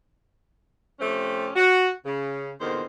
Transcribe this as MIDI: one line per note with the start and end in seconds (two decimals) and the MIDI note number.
0.99 1.49 48
0.99 1.49 53
0.99 1.49 57
0.99 1.49 60
0.99 1.49 61
0.99 1.49 67
1.56 1.88 66
2.04 2.50 49
2.60 2.84 40
2.60 2.84 46
2.60 2.84 50
2.60 2.84 51
2.60 2.84 72